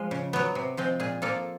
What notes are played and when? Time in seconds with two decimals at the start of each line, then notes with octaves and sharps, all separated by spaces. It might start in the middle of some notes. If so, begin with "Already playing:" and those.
Already playing: F3 G#3
0.11 C#3
0.33 F#3 B3
0.55 C3
0.77 F3 G#3 C4
1.00 A#2 G#4
1.22 F3 A#3 A4